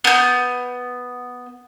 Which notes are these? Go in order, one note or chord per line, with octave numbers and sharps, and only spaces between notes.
B3 G6